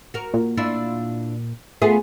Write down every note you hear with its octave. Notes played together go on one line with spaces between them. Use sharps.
F#4 A#4
A#2
D4 E4 F4
A3 B3 F4 G#4